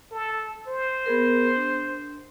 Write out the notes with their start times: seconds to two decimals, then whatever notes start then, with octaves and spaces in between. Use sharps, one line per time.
0.12 A4
0.67 C5
1.06 B3 G#4 A#4
1.56 D4